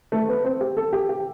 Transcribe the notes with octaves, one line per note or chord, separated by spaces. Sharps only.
A3
B3
C4
G4
A4
G4
G4